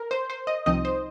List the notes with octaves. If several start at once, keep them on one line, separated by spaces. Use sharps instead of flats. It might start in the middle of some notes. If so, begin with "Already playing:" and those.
Already playing: A#4
C5
C5
D#5
C2 C3 F3 C4 D#4 D#5
C5